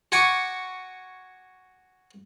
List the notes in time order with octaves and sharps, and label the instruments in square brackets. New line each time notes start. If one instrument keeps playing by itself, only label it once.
[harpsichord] F#4 G#5 C#6 D6